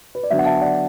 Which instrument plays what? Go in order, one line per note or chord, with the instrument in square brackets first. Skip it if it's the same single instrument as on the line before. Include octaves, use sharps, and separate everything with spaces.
[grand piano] B4
D5
D3 F#3 B3 D4 E5
F#5
E5 A5
D5 F#5